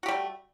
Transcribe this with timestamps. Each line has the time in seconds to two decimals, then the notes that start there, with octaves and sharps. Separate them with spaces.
0.03 F#4
0.06 G4
0.08 G3
0.11 A3